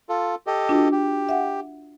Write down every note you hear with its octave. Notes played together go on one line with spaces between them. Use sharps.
F4 A4
G4 A4 D#5
D4 F4 F#4
G4
E5 F#5